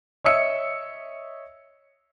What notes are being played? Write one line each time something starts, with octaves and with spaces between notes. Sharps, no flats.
C#5 D#5 E5 D#6 E6 C#7